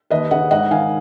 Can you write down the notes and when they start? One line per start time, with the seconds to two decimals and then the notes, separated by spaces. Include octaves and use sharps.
0.10 D#2 B4 D#5
0.31 C#3 D#5 F#5
0.51 G#2 D#5 F#5
0.71 D#3 F5 G#5